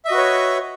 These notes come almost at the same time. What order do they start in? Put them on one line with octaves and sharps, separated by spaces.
E5 D#5 F#4 B4 C#5